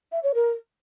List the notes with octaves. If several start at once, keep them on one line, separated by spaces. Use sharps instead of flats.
E5
C#5
A#4